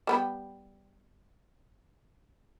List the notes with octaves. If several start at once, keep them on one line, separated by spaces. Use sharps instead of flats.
G3 B3 G4